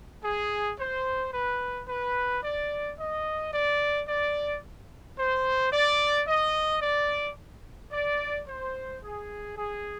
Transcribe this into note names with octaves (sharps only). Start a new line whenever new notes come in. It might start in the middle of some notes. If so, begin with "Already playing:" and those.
G#4
C5
B4
B4
D5
D#5
D5
D5
C5
D5
D#5
D5
D5
C5
G#4
G#4